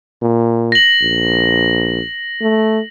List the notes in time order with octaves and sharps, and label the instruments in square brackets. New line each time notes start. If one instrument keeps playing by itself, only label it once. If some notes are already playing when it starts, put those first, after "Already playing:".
[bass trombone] A#2
[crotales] A#6 F#7
[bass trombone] A#1
A3